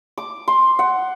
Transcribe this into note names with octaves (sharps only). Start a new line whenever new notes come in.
D6
C6
F#5